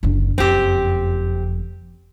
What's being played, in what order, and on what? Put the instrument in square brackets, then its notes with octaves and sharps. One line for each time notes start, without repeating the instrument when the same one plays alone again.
[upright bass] F#1 D3
[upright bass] F#1 F2 [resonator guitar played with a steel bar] C4 G4